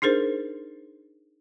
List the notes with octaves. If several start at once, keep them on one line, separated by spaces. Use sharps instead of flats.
D4 D#4 G#4 A#4 C5